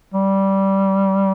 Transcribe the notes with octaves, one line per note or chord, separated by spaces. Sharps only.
G3